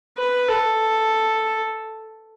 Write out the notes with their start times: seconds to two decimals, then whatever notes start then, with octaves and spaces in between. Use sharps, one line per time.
0.18 B4
0.49 A4